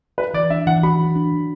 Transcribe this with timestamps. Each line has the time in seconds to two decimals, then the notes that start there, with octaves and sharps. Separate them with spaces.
0.18 F#4 B4
0.34 E3 D5
0.50 D4 E5
0.66 E3 F#5
0.83 F#4 B5
0.99 E3
1.16 D4
1.32 E3